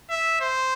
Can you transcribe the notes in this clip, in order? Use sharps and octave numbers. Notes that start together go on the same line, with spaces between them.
E5
C5